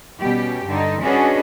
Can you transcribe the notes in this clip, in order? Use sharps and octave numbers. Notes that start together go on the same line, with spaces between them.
B2 G3 C#4 G4
G2 D3 D#4
C#4 D4 F#4 G#4 B4 D#5